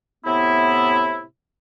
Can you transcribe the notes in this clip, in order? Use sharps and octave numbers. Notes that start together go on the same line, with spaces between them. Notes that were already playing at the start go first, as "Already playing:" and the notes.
A2 C3 B3 E4